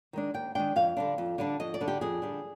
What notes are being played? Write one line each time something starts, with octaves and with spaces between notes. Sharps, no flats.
D#3 G#3 D4
D#2 G5
D#3 G#3 D4 G5
F2 F5
D3 G3 D4
F2
D3 G3 D4
F2 D#5
D5
D3 G3 D4
G4
F2 G#4
D3 G3 D4